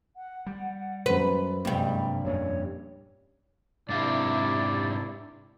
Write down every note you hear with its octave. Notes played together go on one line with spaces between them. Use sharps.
F#5
G3
F#2 B4 C5
G2 C3 G3 G#3 A#3
F2 A#2 C#4 C#5
G#2 C3 D4 E4 D5 F5